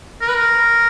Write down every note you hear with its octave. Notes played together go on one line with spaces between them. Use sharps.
A#4
B4
A#4